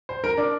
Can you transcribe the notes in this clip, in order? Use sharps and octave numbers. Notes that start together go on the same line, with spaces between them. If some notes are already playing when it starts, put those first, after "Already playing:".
C5
A#4
D4